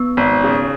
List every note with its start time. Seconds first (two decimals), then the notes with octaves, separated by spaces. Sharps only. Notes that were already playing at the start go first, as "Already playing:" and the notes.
Already playing: B3
0.17 G#1
0.44 C#3